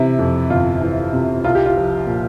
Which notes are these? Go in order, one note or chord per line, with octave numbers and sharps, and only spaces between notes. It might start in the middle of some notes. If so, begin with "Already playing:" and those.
Already playing: C3 E3 E4
F2
G1 F4
E3
C3
C2 F4
G4
F4
F3
A#2